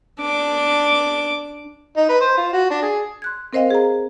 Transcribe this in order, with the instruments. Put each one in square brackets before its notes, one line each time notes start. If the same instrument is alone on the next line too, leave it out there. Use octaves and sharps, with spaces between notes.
[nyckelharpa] D4 D6
[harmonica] D#4
B4
C5
F4
F#4
D4
G#4
[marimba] C6 F#6 G#6
C4 A#4 C5 D#5 F5 G5
G#4 A#5